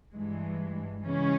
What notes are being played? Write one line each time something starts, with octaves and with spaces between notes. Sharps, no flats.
G2 E3 G#3
C#3 E3 G#3 C#4